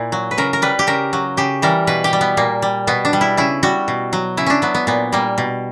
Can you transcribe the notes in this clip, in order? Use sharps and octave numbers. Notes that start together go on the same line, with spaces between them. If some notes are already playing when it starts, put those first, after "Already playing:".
Already playing: A#2 E4
F#3
B4
C#3 A#4
A#4
G3 B4
G4
C#3 A#4
F#3
C#3 G4
E3 G3 A#4
B2 B4
G4
G3
B3
A#2 A#3
G3
B2 B3
D4
G3
E4
C#3 E4
G3 F#4
B2
F#3
C#3 E4
C#4 D4
F#3 B3
B3
A#2 B3
G3 A#3
B2